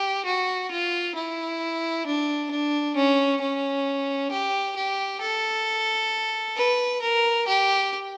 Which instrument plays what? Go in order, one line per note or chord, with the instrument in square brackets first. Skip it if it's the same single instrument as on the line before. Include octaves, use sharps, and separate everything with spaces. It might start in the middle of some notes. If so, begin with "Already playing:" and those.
Already playing: [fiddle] G4
F#4
F4
E4
D4
D4
C#4
C#4
G4
G4
A4
B4
A#4
G4